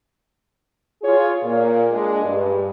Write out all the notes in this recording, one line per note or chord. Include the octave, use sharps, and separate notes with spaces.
F4 G#4 C#5
A#2
G#3 D4
G2